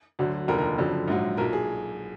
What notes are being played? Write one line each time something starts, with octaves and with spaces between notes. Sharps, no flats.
D2 D3 F#3
F1 D#2 D3 F3 A#4
A#4
F#1 F2 D3 F#3
A#1 G#2 F#3
B1 A#2 F#3 A#4
G#4